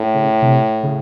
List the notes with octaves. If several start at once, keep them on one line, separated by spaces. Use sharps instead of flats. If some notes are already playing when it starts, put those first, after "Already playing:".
Already playing: A2
C#3
C3
C#3